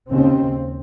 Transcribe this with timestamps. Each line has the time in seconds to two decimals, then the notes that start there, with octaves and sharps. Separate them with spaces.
0.10 D#2 C#3 C4